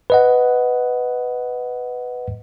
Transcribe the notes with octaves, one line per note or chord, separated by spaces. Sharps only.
B4 D#5 F#5